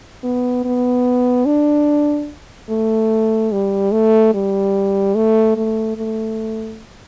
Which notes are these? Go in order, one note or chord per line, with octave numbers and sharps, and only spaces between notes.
B3
B3
D4
A3
G3
A3
G3
A3
A3
A3